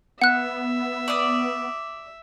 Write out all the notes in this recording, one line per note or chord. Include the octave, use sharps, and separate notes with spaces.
B3 E5 F#5 F#6
D5 D#6